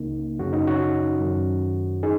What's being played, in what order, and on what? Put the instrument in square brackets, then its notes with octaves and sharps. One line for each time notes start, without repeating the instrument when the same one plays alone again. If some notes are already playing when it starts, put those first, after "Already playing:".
Already playing: [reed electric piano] C#2 C#3 A#3 D#4
F#2 C#3 F#4
D#4
C#4 F#4
F#2 D#3
D#4 G#4